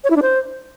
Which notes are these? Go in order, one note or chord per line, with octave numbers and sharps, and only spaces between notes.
C#5
E4
D4
C5